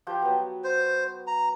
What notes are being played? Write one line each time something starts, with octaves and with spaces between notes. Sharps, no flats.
F3 G4 G5
F#3 B3
C5
A#5